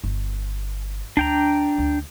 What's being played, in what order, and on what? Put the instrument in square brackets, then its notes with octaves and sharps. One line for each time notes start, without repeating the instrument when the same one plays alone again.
[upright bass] G1
[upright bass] D2 [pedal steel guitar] D4 G5 A#5
[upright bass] D2